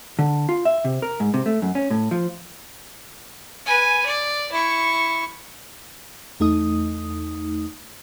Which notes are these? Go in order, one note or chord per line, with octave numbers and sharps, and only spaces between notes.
D3
F4
E5
C3
A#4
G#2
C3
A3
F#2
C#4
A2
F3
B4 G#5
D5
E4 C#6
E2 A3 D#4 D#6